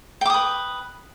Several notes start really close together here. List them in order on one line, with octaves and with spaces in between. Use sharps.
G5 D6 D#6 B4